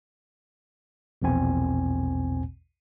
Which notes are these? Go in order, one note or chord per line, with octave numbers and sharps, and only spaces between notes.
A#1 E2 B2 C4 G#5